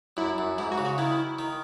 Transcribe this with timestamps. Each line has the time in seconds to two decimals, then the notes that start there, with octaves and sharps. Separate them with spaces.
0.17 F#2 E4
0.38 F#2
0.58 G#2 E4
0.72 F#4
0.78 C#3
0.85 F#4
0.98 D#3 E4
1.39 D#3